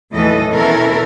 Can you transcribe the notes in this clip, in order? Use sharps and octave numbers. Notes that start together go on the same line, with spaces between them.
D#2 A2 E3 F#3 A4 D#5
B2 E3 C#4 E4 A4 A#4